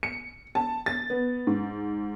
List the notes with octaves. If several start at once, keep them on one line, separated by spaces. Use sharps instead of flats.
C#7
A5
A6
B3
G#2